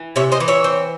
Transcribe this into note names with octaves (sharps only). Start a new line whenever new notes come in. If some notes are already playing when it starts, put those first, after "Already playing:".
Already playing: E3
C3 C#5 E5
C5 D#5
E3
C#5 E5
C4